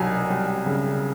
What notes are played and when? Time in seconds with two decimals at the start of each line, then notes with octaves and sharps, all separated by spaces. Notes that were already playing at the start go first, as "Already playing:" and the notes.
Already playing: C2 B2 F#3 G#5
0.30 G3
0.66 C#3